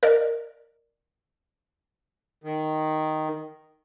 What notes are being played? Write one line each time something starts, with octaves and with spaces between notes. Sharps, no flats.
A#4 D5 D#5
D#3